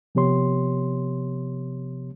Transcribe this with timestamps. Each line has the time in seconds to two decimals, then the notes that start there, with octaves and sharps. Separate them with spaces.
0.15 C3 F3 B3 G4 C#5 C6